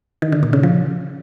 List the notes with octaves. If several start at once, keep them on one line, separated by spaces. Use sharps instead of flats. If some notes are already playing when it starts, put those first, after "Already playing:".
D#3
D3
A#2
C#3
F3